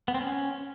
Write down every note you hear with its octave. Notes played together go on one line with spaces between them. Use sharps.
B3
C4
C#4